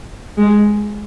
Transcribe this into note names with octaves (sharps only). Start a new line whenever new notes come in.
G#3